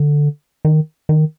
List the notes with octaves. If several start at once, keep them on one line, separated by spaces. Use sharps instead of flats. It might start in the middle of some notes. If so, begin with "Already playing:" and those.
Already playing: D3
D#3
D#3